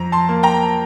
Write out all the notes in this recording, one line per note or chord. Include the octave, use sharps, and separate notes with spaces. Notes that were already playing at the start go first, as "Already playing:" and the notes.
Already playing: F2 A#5
A5 C6
A#3
G5 A#5